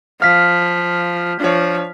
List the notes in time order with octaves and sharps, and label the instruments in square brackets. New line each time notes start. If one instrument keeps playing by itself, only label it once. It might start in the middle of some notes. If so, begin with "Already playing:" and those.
[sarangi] F3 [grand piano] F5 [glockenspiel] F6 B6
[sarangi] F3 [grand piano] D4 C#5